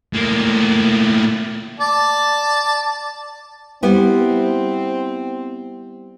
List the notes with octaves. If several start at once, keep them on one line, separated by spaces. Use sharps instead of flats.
A2 A#3
D5 A5
G3 B3 C4 E4